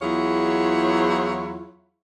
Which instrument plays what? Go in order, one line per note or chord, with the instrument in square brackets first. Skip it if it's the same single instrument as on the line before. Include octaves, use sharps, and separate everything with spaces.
[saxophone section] E2 F#3 E4 F4 G#4 C#5